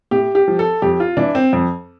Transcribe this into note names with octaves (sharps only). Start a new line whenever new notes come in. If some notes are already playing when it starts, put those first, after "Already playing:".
A2 G4
G4
F3
A4
F2 G4
F4
E3 D4
C4
F2